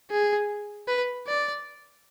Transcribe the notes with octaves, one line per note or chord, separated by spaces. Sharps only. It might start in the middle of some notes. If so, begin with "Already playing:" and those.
G#4
B4
D5